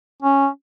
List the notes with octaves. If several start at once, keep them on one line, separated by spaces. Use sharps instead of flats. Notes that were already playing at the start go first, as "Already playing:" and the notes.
C#4